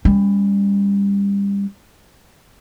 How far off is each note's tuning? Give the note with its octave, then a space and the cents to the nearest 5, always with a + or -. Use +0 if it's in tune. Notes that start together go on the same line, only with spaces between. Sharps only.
G3 +30 C#4 +0